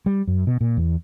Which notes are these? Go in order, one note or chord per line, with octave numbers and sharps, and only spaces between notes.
G3
F#2
B2
A#2
E2